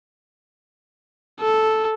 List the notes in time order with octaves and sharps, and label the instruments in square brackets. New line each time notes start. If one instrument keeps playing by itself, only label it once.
[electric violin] A4